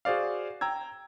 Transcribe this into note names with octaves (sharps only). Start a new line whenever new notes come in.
F#4 G#4 C5 D5 F5
G5 A#5 E6 G#6